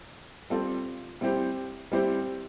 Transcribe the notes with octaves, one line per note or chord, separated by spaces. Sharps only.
G3 C4 F4 A4
G3 C4 E4 G4 C5
G3 C4 E4 G4 C5